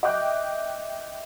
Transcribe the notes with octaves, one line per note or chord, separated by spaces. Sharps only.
D#5 E5 G5 D6 F#6 G6